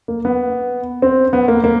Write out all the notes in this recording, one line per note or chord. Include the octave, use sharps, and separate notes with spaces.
A#3
B3
C4
B3
A#3
A#3